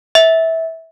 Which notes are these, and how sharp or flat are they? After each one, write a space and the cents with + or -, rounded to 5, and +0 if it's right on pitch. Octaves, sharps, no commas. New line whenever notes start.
E5 -20